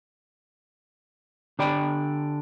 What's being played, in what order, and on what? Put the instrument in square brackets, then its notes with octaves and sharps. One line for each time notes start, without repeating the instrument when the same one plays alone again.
[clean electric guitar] D3 G4 D5 G5 B5